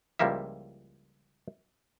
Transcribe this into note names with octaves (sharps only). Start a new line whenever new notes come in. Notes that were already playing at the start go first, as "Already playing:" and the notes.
C#2 F3 G3 A#3 E4 E5